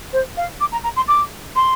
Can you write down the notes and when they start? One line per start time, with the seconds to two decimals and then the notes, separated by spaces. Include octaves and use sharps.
0.13 C5
0.37 F5
0.60 D6
0.72 A#5
0.84 A#5
0.96 C6
1.08 D6
1.56 C6